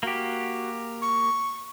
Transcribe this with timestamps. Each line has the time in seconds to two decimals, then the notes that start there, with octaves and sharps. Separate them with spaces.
0.03 A#3 F#4 G4
1.02 C#6